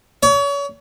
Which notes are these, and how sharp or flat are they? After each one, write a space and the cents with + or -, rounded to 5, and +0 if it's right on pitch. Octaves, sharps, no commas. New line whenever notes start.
C#5 +35